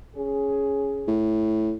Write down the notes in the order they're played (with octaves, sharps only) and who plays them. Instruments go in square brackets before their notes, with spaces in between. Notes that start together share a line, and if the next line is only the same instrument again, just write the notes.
[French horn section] C#4 G#4
[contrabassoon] A2